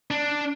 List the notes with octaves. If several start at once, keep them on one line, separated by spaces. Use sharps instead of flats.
D4